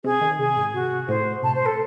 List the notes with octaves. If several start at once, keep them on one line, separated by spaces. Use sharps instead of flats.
C3 G#4
D#3
C3 G#4
G#2
C3 F#4
A2 C5
C3 A5
C5
A2
A4